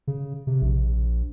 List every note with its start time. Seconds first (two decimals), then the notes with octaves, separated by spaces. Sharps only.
0.07 C#3
0.47 C3
0.62 A#1